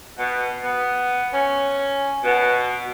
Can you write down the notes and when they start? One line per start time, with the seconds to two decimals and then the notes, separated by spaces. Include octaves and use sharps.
0.18 B2
0.63 B3
1.33 C#4
2.23 B2